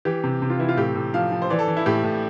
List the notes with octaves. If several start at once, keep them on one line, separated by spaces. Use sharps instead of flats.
E3 G4
C3
C3
F4
E3 E4
F4
A2 G4
A2
F3 F5
F3
C5
E3 D5
A4
E3
E4
A2 G4
A2